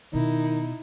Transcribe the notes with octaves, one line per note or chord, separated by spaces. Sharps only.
B2 D#3 D#4 E4